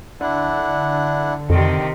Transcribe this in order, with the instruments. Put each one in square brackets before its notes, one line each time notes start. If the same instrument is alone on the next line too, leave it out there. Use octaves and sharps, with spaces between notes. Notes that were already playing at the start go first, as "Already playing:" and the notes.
[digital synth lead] D3 [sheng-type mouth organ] D4 E4 F#5
[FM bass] F2 [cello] C3 D#3